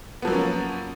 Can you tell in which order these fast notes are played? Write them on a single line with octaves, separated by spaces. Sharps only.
B3 F3 F#3 A#3 C#4